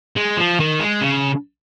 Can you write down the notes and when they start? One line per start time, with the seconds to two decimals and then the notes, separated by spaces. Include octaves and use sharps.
0.16 G#3
0.37 F3
0.60 D#3
0.80 G#3
1.01 C#3